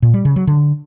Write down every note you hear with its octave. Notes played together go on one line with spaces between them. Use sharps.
A#2
G3
C#3
F#3
D3